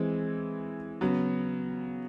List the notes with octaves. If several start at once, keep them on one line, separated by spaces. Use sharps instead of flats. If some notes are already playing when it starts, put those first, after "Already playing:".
Already playing: E3 G#3 C4
C#3 F#3 B3